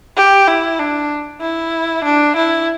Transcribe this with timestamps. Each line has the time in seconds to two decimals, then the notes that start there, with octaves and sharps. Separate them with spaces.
0.16 G4
0.47 E4
0.79 D4
1.41 E4
2.04 D4
2.36 E4